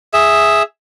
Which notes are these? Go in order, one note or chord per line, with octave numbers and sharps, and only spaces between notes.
G#4 E5